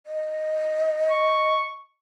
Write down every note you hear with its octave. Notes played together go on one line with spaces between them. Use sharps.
D#5
C#6